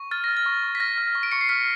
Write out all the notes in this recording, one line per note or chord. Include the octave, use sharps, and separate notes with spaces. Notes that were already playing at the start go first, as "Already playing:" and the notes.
Already playing: C#6
F6 A6
F6 A#6
A6
C#6
C#6
B6
F6 A#6
F6
C#6
D7
C#6 C#7
C7
F6 B6